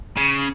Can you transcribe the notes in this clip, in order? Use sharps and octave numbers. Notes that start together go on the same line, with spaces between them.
C#3